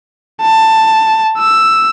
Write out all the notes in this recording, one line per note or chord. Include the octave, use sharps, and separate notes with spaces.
A5
E6